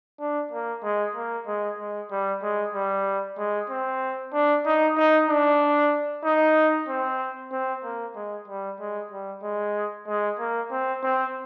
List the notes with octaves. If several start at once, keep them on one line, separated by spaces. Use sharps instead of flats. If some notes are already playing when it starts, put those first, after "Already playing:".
D4
A#3
G#3
A#3
G#3
G#3
G3
G#3
G3
G#3
C4
D4
D#4
D#4
D4
D#4
C4
C4
A#3
G#3
G3
G#3
G3
G#3
G#3
A#3
C4
C4